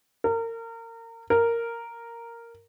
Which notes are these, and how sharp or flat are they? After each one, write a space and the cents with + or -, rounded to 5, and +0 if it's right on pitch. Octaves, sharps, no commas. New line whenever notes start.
A#4 -30
A#4 -5